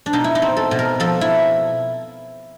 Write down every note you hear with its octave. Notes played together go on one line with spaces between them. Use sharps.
D4
B2 D#4
E4
D#4
C4
A4
B2
A#4
F3 A4
E4